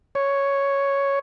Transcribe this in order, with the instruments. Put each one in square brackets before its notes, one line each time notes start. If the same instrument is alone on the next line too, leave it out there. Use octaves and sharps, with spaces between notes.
[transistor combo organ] C#5